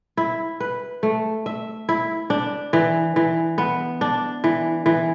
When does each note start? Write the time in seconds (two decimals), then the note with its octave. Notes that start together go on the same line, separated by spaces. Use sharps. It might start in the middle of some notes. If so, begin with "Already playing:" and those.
0.17 E4
0.60 B4
1.03 A3
1.46 E5
1.89 E4
2.30 D4
2.73 E3
3.16 E3
3.58 B3
4.01 D4
4.44 E3
4.86 E3